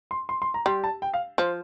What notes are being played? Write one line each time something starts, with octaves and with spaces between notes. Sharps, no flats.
C6
C6
C6
A#5
G3 C6
A5
G5
F5
F3 C5